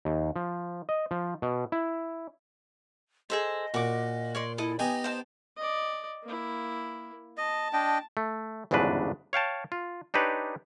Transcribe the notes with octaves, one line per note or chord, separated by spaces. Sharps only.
D#2
F3
D#5
F3
B2
E4
G#4 A4 C5 D#5
A#2 F#4 D6
C#5 D5 C6
E4 A4 D#5
B3 D#4 G4 D#5 G#5
C5 G5 A5
D5 D#5
A#3 E4
D#5 A5
D4 D#5 G5
A3
G1 E2 G#2 C#3 D4 B4
C#5 F5 G5 A5
F4
D4 D#4 G4 B4 C#5